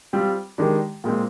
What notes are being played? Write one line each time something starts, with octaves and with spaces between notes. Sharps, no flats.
G3 C4 F4
D#3 G#3 D4 G4
A#2 G#3 C4